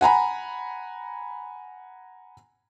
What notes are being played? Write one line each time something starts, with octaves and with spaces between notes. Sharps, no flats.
F#5 G#5 A#5 B5